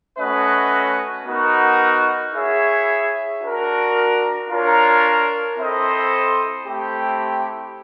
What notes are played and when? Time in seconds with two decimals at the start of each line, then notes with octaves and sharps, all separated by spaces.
0.18 A3 C#4 F#4 B4 D#5
1.25 B3 D#4 F#4 A#4
2.34 E4 G#4 C#5 E5
3.41 D4 F#4 A#4
4.49 D4 F4 A#4 C#5
5.58 C4 E4 A4 C5 D#5
6.66 A3 C4 E4 G4